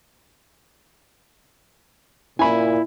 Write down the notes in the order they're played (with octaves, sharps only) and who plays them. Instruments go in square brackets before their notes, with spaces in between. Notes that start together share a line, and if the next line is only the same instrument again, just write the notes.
[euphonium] A#2 [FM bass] E4 [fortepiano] G#5 B5